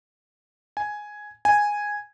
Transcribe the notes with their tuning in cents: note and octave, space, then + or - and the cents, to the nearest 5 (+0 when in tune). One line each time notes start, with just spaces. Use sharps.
G#5 +5
G#5 -5